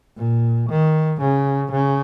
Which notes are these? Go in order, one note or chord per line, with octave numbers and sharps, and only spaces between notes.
A#2
D#3
C#3
C#3